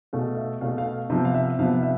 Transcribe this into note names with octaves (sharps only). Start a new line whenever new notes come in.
B2 A3 F5
E5
B2 A3 F5
F5
C3 F3 B3
F5
E5
C3 F3 B3 F5
E5